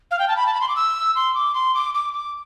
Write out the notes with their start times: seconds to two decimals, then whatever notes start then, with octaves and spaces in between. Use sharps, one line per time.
0.11 F5
0.19 G5
0.28 A5
0.37 B5
0.46 A5
0.54 B5
0.61 C6
0.69 D6
0.76 E6
1.16 C6
1.35 D6
1.54 C6
1.75 D6
1.94 D6
2.13 D6